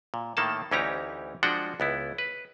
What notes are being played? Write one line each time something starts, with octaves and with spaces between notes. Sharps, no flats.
A#2
A2 D#3 A#3 A4 A5
D2 E3 C#4 D#4 G4 A#5
F3 G#3 D4 F#4 F#5 G5
C#2 B3 E4
B4